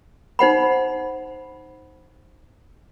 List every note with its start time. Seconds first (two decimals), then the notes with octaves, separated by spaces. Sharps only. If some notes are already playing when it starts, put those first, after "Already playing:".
0.39 D#4 C5 F#5 B5